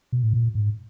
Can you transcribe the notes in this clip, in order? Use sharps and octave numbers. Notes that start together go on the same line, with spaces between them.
B2
A2
A#2
G#2